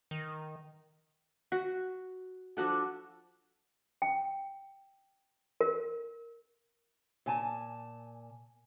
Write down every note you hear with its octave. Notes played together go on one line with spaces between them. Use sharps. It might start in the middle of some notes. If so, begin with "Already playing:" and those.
D#3
F#4
F3 D4 F#4 A4
G5
A#4
A#2 G#5 A5